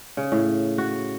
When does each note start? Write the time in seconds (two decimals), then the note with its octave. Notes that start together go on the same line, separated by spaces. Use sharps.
0.17 C#3
0.32 A2
0.78 F#4